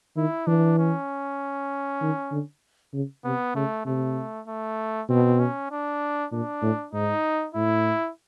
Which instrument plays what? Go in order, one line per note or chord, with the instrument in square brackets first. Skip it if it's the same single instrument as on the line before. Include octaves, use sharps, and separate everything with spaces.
[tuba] D#3 [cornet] E4
[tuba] E3 [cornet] D4
[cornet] C#4
[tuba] D#3
D3
C#3
[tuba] C3 [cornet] B3
[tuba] C#3 [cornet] A3
[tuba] C3 [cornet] A3
[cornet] A3
[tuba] B2 [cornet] C4
[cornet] C#4
D4
[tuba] A#2 [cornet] D4
[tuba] A2
[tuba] G#2 [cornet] D#4
[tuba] A2 [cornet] E4